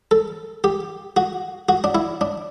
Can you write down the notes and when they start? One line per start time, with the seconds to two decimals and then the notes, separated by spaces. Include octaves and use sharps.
0.11 A4
0.64 G4
1.17 F#4
1.69 F#4
1.84 D4
1.95 E4
2.21 D4